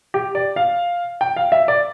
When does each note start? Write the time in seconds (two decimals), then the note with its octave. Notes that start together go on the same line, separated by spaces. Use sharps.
0.14 G4
0.35 D5
0.56 F5
1.21 G5
1.36 F5
1.52 E5
1.68 D5